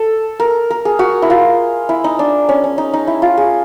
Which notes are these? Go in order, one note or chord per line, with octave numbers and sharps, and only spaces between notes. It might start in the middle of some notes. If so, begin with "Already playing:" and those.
Already playing: A4
A#4
A#4
G#4
F#4
E4
F4
E4
D#4
D4
C#4
C#4
D#4
D#4
E4
F4
G#4